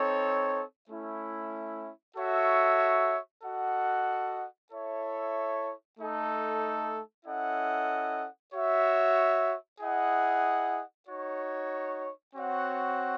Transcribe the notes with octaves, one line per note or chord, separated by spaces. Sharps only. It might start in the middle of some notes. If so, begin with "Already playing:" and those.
Already playing: C4 D#4 A4 C#5
A3 C#4 E4
F#4 A4 C#5 E5
F#4 A4 D#5 F#5
E4 A4 C#5 E5
A3 D#4 A4
C#4 E4 A4 D#5 F#5
F#4 C#5 E5
E4 G#4 D#5 F#5
D#4 F#4 C#5
C4 F#4 C#5 F#5